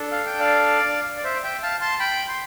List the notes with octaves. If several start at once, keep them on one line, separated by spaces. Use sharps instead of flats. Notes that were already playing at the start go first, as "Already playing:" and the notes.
Already playing: D4 A4
F5
G5
D5 F5
D5
C5 E5
E5 G5
F5 A5
A5 C6
G5 B5
C6